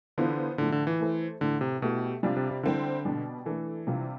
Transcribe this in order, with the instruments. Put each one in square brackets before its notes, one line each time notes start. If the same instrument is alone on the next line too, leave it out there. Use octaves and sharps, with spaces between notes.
[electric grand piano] D3 [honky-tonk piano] E3 B3 F4 C5
[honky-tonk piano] A2 F3 A3 [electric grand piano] D3
[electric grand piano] D3
E3
[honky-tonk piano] A3 E4 A4 C5
[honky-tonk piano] A2 E3 A3 [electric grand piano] D3
[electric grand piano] C3
[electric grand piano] B2 [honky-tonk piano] A3 E4 G4
[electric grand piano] C3 [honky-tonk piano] G3 D4 F4
[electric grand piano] C3
C3
[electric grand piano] D3 [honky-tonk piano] G3 C4 E4
[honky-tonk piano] B2 G3 D4
[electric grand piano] E3 [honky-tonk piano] A3 D4 A4
[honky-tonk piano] C3 G3 D4 F4